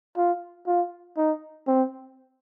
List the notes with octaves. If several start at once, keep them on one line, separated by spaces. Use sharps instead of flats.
F4
F4
D#4
C4